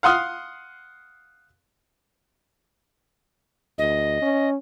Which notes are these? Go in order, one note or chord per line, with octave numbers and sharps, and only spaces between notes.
F5 F#5 C6 D#6 F6 F#6
D2 D#5
C#4